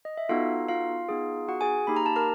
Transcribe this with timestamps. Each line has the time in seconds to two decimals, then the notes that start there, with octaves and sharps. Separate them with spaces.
0.05 D#5
0.17 E5
0.29 B3 D#4 F4 F#4 A4 F5
0.68 F4 F5
1.09 B3 D#4 G#4
1.49 F#4 F#5
1.61 G#4 G#5
1.87 A#3 D#4 G4 B5
1.96 A#5
2.06 A5
2.16 A#4 A#5